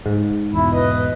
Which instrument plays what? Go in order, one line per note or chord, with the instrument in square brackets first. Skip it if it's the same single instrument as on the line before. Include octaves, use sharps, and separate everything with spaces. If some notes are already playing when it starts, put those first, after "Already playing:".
[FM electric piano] G#2
[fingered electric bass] E2 B2 [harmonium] E4
[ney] B4 [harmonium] D#5